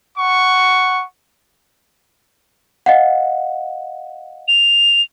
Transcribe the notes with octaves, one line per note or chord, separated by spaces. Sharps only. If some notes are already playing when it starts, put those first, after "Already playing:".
F#5 C#6
D#5 F5 F#5
F7